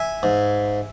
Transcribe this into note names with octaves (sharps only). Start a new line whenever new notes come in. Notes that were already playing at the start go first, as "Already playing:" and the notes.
Already playing: E5 G#5
G#2